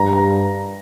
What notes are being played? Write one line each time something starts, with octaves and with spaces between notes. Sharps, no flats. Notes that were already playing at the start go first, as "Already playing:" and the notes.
Already playing: G2 A#5
A#5